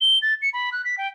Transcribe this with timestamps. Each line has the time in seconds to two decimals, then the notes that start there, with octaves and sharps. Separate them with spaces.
0.01 G7
0.22 A6
0.42 C#7
0.53 B5
0.72 F#6
0.85 B6
0.98 G5